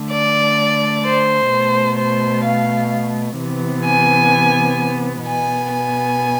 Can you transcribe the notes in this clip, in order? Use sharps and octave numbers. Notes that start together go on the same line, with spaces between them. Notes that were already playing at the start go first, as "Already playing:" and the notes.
Already playing: D3 A3
D5
C5
B2 A3
C5
F5
C3 E3 B3
G#5
B2 B3 G#5
G#5